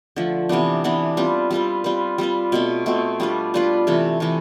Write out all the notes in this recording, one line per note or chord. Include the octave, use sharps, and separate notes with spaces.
D3 F3 A3
C3 E3 B3 D4
C3 E3 B3 D4
G3 C4 F4 B4
G3 C4 F4 B4
G3 C4 F4 B4
G3 C4 F4 B4
B2 A3 C4
B2 A3 C4
G3 D4 F4 B4
G3 D4 F4 B4
C3 E3 A3
C3 E3 A3